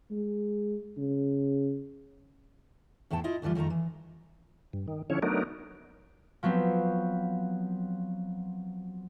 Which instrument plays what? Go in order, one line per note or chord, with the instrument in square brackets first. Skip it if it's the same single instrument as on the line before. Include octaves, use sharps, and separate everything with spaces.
[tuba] G#3
C#3
[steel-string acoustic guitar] E2 A2 B3 G5 A5
E4 F4 D#5
D2 E3 F3 G3 F4
F2 D#3 A3 F4 A#5
E3
[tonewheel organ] G2
D#3
D3 F3 C#4 E4 C#5
F#3 A3 B3 D4 D#4 A#4
[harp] F3 F#3 B3 C4